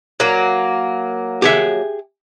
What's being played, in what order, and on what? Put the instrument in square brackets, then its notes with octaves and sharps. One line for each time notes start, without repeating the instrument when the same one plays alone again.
[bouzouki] F#3 A#3
[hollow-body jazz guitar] G4 G#4 E5